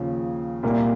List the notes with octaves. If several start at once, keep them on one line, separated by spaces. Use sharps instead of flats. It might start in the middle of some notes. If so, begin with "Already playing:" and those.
Already playing: D#2 C#3 F3
C2 A#2 G3 A#3